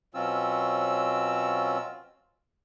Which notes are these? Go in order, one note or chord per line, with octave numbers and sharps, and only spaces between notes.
B2 F#3 C4 C#4 F4 E6